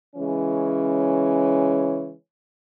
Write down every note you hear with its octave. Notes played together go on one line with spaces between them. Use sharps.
C#3 E3 G#3 C#4